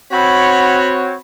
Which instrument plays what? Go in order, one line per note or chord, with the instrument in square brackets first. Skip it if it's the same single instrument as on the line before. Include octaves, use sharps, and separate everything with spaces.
[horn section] C4 F#4 C#5 [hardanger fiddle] B5